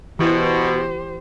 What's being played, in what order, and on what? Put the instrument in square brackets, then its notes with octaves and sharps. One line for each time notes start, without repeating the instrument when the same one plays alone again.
[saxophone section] B2 [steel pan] E3 [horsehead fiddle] G4 C5